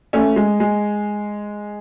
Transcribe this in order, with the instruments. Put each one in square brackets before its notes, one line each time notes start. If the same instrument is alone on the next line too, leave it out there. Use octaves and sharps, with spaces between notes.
[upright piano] A3 C#4
G#3
G#3